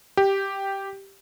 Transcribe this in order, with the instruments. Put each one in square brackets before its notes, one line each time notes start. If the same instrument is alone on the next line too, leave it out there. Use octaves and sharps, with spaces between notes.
[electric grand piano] G4